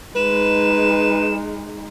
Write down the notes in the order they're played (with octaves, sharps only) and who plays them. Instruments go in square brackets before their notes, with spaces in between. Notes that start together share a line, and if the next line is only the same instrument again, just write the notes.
[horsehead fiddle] G#3 D#4 [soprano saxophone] B4 [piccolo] E7